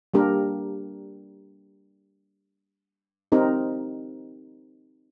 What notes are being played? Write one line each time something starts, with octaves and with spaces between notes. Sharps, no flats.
G3 A#3 D4 G4 A#4
C4 D#4 G4 A#4